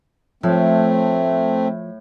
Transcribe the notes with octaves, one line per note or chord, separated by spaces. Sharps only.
A2 F3 A3 C4